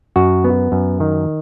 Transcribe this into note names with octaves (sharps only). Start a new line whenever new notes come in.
F#2 F#4
B3
F#2
D#3